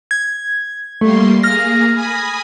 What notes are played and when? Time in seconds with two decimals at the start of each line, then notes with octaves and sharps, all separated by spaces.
0.11 G#6
1.01 G3 A3 A#3 C6
1.43 A#3 G#4 F6 A#6
1.93 G#5 B5 D#6